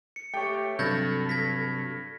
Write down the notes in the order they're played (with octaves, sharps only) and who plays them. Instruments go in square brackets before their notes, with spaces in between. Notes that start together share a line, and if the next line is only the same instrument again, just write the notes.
[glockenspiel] C#7
[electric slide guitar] A3 G4 C#5 [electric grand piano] G5
[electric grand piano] G2 [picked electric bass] C3 F#3 [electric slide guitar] A4 [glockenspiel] G6 G#6 A#6
[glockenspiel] G#6 A#6 B6